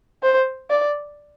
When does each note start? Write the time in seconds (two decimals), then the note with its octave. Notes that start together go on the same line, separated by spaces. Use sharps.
0.23 C5
0.71 D5